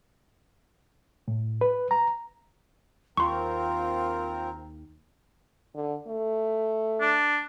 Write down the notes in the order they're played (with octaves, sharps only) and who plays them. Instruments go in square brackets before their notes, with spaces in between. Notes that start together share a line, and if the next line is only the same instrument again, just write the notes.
[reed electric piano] A2
B4
A#5
[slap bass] D#2 [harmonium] C4 A#4 [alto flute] F4 [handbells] C6 C#6
[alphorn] D3
A3
[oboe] D4